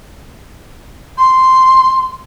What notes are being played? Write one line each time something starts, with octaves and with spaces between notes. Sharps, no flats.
C6